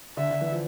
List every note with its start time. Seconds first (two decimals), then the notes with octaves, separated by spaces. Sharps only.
0.17 D3 E5
0.31 D3
0.41 E3
0.52 F3